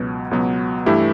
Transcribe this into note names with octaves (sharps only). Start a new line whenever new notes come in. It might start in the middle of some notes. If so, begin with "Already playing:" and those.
Already playing: C#2 B2 F#3 B3
C#2 B2 F#3 B3
G2 E3 A3 E4 G4